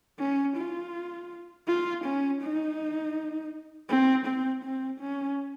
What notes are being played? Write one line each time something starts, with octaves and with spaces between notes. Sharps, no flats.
C#4
F4
F4
C#4
D#4
C4
C4
C4
C#4